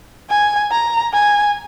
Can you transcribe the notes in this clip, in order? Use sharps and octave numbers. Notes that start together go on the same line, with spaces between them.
G#5
A#5
G#5